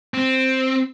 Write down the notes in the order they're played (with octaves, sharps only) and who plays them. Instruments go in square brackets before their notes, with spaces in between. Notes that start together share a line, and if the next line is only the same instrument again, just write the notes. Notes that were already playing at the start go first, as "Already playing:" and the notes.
[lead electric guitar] C4